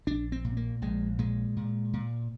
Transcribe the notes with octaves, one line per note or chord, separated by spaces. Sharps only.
A#1 D4
C4
A#2
A#3
A#1 G#3
A#2 G#3
A#2
A#2